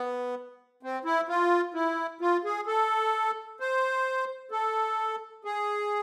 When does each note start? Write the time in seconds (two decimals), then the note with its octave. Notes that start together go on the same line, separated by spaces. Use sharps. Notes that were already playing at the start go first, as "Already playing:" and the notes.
Already playing: B3
0.83 C4
1.05 E4
1.29 F4
1.74 E4
2.21 F4
2.45 G#4
2.66 A4
3.60 C5
4.51 A4
5.45 G#4